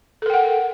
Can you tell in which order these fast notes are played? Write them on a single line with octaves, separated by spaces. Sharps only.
A4 A#4 G5 F#5